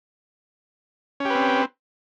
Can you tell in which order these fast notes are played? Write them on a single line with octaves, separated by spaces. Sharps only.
C#4 G4 B4 C4